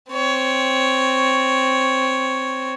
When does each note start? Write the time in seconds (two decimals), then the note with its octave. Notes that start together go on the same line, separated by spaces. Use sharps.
0.11 C4 C#5